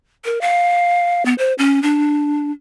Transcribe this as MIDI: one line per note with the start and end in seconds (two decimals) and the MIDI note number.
0.25 0.41 70
0.41 1.25 77
1.25 1.34 59
1.38 1.54 72
1.58 1.82 61
1.83 2.51 62